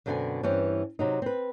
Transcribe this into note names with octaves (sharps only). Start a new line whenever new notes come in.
F#2 B2 D3 C4 G5 G#5
G2 E3 C4 C#4
C3 F#3 D#4
C4 B4